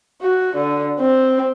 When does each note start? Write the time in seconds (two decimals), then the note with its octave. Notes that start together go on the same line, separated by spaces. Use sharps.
0.22 F#4
0.56 D3
1.00 C4